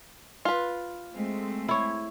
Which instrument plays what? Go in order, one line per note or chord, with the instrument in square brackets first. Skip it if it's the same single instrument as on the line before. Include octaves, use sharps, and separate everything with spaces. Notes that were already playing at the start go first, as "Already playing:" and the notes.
[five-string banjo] F4 B4
[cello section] G#3 A3 C4
[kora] E4 C#5